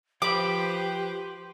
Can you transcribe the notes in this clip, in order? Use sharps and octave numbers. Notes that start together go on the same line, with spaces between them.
F3 G4 B4 C5 B5 D6